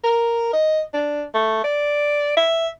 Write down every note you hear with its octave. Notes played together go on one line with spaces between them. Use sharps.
A#4
D#5
D4
A3
D5
E5